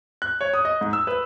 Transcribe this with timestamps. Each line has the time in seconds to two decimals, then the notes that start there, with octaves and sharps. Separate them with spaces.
0.22 F#6
0.41 C#5
0.54 D#6
0.65 D#5
0.81 G#2
0.93 E6
1.07 B4